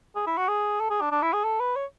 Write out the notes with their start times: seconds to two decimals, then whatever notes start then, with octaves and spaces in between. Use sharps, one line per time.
0.16 G#4
0.27 E4
0.37 F#4
0.48 G#4
0.80 A4
0.90 G#4
1.01 D4
1.11 D4
1.22 E4
1.33 G#4
1.44 A4
1.60 B4
1.76 C#5